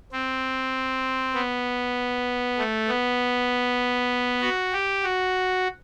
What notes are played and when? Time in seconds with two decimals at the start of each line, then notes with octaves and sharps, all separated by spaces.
0.12 C4
1.34 B3
2.58 A3
2.89 B3
4.41 F#4
4.73 G4
5.03 F#4